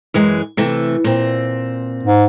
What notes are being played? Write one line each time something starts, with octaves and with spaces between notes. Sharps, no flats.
F#2 E3 G#3
C3 E3 A3
A#2 C4
G#2